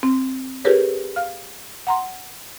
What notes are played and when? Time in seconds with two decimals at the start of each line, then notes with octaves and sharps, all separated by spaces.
0.03 C4
0.65 F4 G4 G#4 A#4 B4 C#5
1.16 F5 F6
1.87 F#5 A#5 C6